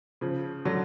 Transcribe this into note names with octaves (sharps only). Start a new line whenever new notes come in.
C#3 F3
D3 F#3